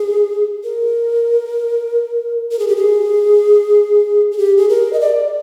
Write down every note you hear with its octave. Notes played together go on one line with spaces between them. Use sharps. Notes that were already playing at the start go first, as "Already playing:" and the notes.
Already playing: G#4
A#4
A#4
G#4
G4
G#4
G#4
G4
G#4
A#4
D#5
D5